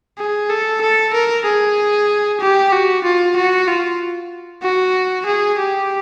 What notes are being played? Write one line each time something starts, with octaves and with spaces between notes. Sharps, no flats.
G#4
A4
A4
A#4
G#4
G4
F#4
F4
F#4
F4
F#4
G#4
G4